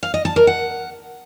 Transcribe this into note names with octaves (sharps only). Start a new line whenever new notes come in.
F5
D#5
A5
A#4
F#5